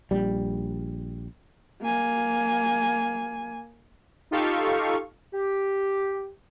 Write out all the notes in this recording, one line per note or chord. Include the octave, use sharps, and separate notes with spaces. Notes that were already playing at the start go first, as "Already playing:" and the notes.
A#1 G3
A#3 G#5
D#4 F4 G4 A4 F5 C#6
G4